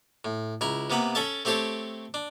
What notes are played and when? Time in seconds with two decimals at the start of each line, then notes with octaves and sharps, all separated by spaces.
0.25 A2
0.61 C#2 E4 A#5
0.90 C3 A#3 B3 A#5 B5
1.15 C#4 A4 E5 A5
1.45 A3 C4 G4 A4 C5 C#5
2.14 D4